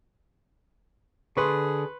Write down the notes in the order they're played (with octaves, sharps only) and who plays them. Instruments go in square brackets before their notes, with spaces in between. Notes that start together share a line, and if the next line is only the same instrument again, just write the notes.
[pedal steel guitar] D3 [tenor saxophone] G#4 [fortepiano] B4 C6 C#6